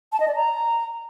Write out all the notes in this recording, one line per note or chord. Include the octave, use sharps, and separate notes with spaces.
A5
D#5
D5
A#5